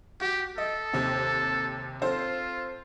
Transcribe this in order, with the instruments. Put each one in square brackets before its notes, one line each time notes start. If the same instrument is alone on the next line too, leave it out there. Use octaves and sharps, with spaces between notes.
[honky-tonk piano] F#4 [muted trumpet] G4
[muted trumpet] A4 [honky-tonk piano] D#5
[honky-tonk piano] D#2 C3 C4
[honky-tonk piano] C4 A4 C5 [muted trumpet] F4